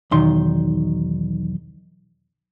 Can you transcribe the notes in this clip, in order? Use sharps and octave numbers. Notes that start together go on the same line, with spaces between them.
B1 E2 D#3 C6